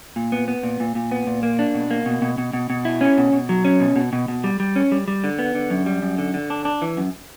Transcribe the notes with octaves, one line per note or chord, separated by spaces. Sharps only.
A#2
B3
B3
A#2
A#2
A#2
B3
A#2
A#3
D4
B2
A#3
B2
B2
B2
B2
B2
E4
C#4
B2
B2
F#3
C#4
B2
B2
B2
B2
G3
G3
C#4
G3
G3
D3
B3
D3
F#2
G3
F#2
D3
D3
D4
D4
E3
F#2